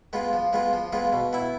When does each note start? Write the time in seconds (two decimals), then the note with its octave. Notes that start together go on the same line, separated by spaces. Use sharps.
0.13 G#3 B3 F4
0.33 F3
0.53 G#3 B3 F4
0.73 F3
0.93 G#3 B3 F4
1.13 B2
1.33 B3 E4